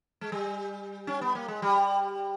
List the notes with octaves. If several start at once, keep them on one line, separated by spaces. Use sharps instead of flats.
G#3
G3
C#4
B3
A#3
G#3
G3